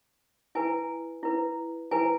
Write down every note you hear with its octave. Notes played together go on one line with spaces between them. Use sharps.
E4 B4 G#5
E4 B4
E4 B4 G#5